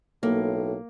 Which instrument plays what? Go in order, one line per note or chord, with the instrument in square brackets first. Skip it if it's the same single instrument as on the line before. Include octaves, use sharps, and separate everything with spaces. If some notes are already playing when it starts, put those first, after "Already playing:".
[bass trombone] B1 [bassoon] A2 [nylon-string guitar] A#3